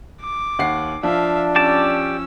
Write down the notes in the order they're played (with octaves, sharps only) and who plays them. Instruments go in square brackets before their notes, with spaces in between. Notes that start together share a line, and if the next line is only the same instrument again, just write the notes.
[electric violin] D6
[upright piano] D#2 F#5 C7
[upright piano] F3 [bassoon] D4 [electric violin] E5 F5
[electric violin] C#4 E6 [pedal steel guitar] G4 D5 A5